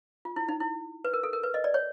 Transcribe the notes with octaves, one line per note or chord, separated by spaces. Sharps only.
F4
E4
D#4
E4
B4
A#4
A4
A#4
B4
D#5
D5
C#5